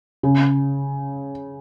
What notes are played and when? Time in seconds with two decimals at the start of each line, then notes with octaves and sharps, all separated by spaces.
0.23 C#3